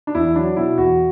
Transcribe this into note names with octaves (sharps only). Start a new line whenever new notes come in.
D4
E2 E4
F#3 D4
B2 E4
E2 F#4